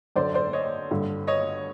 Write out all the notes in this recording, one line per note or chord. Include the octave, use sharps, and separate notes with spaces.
F#2 D3 C5 D5
C5 D5
C#5 D#5
G2 D3
C#5 D#5